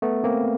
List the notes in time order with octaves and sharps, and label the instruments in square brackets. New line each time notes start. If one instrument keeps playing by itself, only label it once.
[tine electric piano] A3 B3
A#3 C4